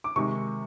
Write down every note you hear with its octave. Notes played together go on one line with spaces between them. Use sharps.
D6
C3 D#3 G#3 C#6